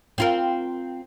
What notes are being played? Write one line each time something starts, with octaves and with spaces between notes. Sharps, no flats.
C4 F4 A#4